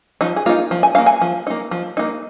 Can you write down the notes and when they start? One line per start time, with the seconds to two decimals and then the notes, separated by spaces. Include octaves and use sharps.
0.21 F3 D#4
0.36 G#4
0.46 A#3 F4
0.49 D#4
0.71 F3
0.83 G#5
0.95 D#4 F5
0.98 A#3
1.06 G#5
1.21 F3
1.47 A#3 D#4
1.71 F3
1.97 A#3 D#4